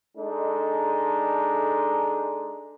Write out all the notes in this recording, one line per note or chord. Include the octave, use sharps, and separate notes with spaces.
G#3 D4 D#4 A4